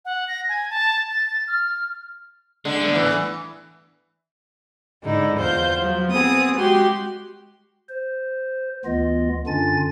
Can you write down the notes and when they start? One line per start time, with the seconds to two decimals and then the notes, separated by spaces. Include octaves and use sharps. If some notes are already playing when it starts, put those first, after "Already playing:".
0.05 F#5
0.28 A#6
0.49 G#5
0.70 A5
1.11 A6
1.48 F6
2.65 D3 G#3
2.80 A3 B3
2.95 E3
5.03 G#2 D3 G#3 D#4 E4
5.37 E2 F4 C5 G6
5.80 F3 F#3
6.11 B3 C4 G#4 D#6
6.57 G#3 F#4 G4 C6
7.89 C5
8.85 D2 E3 B3 F4 D#5
9.47 F#2 D3 D4 F4 G#5 A6